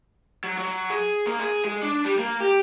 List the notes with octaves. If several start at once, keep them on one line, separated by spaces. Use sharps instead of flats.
F#3
F#3
G#4
A#3
G#4
G#3
D4
G3
A#3
G4